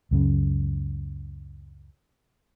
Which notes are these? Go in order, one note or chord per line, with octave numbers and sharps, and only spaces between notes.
C#2 F#2 C#3